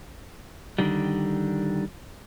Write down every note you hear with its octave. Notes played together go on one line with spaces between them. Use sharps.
D3 D#3 G3